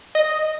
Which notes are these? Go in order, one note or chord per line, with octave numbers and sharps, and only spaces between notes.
D#5